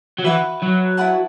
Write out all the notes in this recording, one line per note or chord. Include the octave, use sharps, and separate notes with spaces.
F#3
E3 F#4 B4 E5 B5
F#3
E4 B4 F#5 A5